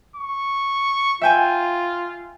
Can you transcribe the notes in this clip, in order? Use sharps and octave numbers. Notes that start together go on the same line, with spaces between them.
C#6
F4 E5 G5 G#5